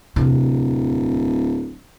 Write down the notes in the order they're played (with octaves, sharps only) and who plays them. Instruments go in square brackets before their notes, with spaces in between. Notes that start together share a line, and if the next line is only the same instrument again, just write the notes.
[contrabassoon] D1 [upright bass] E2 C3